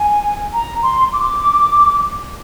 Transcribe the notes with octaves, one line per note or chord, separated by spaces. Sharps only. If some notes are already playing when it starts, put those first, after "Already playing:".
Already playing: G#5
A#5
C6
D6